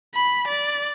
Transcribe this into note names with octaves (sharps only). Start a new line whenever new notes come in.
B5
D5